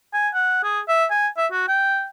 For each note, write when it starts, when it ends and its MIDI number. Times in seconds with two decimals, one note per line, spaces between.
0.14 0.29 80
0.34 0.63 78
0.63 0.80 68
0.88 1.06 76
1.11 1.28 80
1.37 1.47 76
1.52 1.67 66
1.68 2.07 79